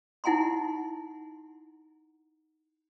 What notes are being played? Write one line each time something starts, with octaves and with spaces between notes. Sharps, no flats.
D#4 E4 F#5 G#5 A#5 C6